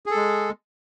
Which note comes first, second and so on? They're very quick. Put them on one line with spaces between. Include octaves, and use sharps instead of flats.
G#4 A4 G#3